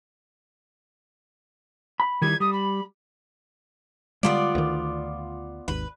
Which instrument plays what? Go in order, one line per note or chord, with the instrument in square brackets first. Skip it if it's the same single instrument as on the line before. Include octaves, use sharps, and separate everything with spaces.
[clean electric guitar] B5
[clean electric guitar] D#3 G3 E4 [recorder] G#6
[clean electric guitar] G3 [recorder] D#6
[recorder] B5
[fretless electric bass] D3 G3 G#3 [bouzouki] B3 F4 D5
[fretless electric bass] D2 D#3
[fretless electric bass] G#1 D#2 [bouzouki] B4